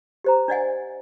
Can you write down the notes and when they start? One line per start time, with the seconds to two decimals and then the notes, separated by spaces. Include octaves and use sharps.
0.24 G4 C5 A#5
0.48 D4 D5 D#5 F#5 G#5